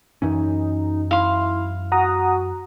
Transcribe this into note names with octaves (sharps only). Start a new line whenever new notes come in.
F#2 E3 C#4 D#4
E4 F5 C6
F#4 F#5 A#5 D#6